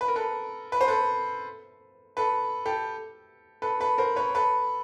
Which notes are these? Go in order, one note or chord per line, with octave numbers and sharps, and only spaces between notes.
B4
A#4
A4 B4
B4
C5
A4 B4
A4 B4
G4 A4
A4 B4
A4 B4
A#4 C5
B4 C#5
A4 B4